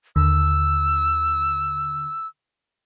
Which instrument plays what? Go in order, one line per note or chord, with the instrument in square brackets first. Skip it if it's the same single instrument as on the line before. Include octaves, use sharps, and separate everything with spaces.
[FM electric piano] D#2 D3 [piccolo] E6